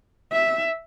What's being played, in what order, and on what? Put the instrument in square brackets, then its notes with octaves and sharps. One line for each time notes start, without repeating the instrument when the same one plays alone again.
[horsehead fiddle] E5